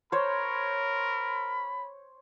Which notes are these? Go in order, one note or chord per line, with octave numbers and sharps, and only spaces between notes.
A#4 C5 C#5 B5